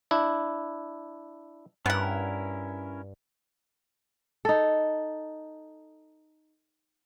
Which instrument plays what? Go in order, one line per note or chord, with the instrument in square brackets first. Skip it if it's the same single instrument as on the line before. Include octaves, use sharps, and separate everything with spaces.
[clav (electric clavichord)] D4 E4
[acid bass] G2 [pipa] B3 F#5 [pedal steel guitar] C#4 E4 A#4
[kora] D#4 A4